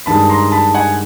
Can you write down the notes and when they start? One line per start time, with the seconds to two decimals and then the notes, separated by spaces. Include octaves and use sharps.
0.06 G2 D#3 G#3 A5 B5
0.29 A#5 C6
0.52 A5 B5
0.74 F#5 G#5